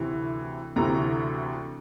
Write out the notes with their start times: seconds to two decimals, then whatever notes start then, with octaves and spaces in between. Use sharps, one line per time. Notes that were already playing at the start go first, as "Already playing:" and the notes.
Already playing: D2 C3 E3
0.76 D2 C3 E3 A#5